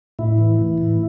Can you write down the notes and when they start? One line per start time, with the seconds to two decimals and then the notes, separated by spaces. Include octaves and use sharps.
0.19 A2 E4
0.38 E3
0.59 E3
0.78 A2